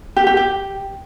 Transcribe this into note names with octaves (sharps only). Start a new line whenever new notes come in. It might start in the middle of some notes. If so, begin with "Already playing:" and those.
G4
G4
G4